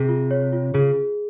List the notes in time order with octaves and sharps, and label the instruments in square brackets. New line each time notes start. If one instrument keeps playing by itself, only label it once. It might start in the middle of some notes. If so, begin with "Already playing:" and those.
Already playing: [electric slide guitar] C3 [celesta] G#4
[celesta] F4
C#5
F4
[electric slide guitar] C#3 [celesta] G#4